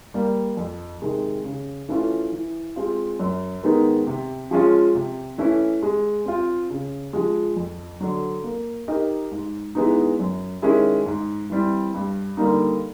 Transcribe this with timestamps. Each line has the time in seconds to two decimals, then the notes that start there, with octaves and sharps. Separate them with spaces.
0.14 G3 A#3
0.57 F2
1.02 C3 D#3 G#3
1.45 C#3
1.89 E3 A3 C#4 F4
2.32 E3
2.76 G#3 C4 F4
3.19 F#2
3.63 D#3 G#3 B3 D#4
4.07 C3
4.51 F3 G#3 C#4 F4
4.95 C3
5.38 E3 A3 C#4 E4
5.83 G#3
6.26 C4 F4
6.70 C#3
7.13 F3 G#3
7.56 F2
8.01 D3 F#3
8.44 A#3
8.88 D#4 G4 A#4 D#5
9.32 G#2
9.75 E3 G#3 B3 D#4
10.19 F#2
10.62 D#3 G#3 C#4 E4
11.06 G#2
11.50 E3 G3 C4
11.94 G2
12.37 D3 G3 A#3 D#4